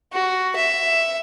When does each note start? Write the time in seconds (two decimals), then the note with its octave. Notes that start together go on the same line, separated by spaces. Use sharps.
0.13 F#4
0.56 E5